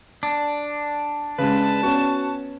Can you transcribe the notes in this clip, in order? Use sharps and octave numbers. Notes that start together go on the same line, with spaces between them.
D4
C#3 G#3 B4 A5
B3 C#4 F#4